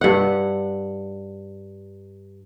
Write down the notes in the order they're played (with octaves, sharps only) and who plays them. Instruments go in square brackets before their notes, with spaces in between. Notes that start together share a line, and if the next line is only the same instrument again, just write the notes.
[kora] G2 F#5